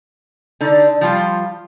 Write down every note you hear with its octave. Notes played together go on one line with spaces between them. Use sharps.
D3 D#4 D5
F3 G3 F4